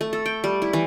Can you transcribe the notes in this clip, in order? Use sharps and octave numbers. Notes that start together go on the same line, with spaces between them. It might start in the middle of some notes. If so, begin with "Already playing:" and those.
A3
A4
G5
G3
E4
E3